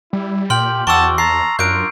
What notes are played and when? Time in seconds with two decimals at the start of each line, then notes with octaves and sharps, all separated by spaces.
0.13 G3 E4
0.50 A#2 G4 G5 C6 F6 F#7
0.87 E2 F#4 D5 G5 A5 C#6 E6
1.18 A5 A#5 C7
1.59 F#2 D4 F4 A#4 G6 D7